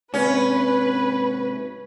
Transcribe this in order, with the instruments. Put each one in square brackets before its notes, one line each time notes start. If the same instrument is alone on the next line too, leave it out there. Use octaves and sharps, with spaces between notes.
[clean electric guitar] G#2 C3 [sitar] C#4 [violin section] B4